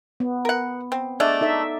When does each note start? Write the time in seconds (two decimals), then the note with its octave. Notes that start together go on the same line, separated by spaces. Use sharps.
0.20 B3
0.45 A#4 F#5
0.92 C4
1.20 G#3 A3 D4 D5
1.41 D#4 A4 E5